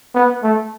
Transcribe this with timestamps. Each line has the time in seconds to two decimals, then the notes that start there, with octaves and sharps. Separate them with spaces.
0.15 B3
0.43 A3